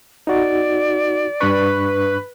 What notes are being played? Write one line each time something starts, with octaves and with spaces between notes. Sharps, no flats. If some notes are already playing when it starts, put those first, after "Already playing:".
D#4 F#4 D5
G2 D4 B4 C#6